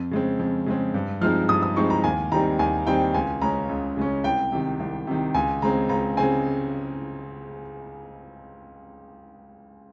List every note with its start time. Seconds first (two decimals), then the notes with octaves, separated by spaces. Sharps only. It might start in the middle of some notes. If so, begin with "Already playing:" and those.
Already playing: F2
0.11 C#3 G#3 C4
0.39 F2
0.66 C#3 G#3 C4
0.94 G2
1.21 F3 G#3 C4 D#4 F6
1.49 G2 D#6
1.63 D#6
1.76 F3 G#3 C4 D#4 C#6
1.90 A#5
2.04 D#2 G#5
2.32 D#3 G3 C4 D#4 A#5
2.59 D#2 G#5
2.87 D#3 G3 C4 D#4 G5
3.14 C#2 G#5
3.42 C#3 G#3 C#4 A#5
3.69 C#2
3.97 C#3 G#3 C#4
4.24 C2 G5
4.52 C3 D#3
4.80 C2
5.07 C3 D#3
5.34 C#2 G#5
5.62 C#3 G#3 C4 A#5
5.89 C#2 A#5
6.17 C#3 G#3 C4 G#5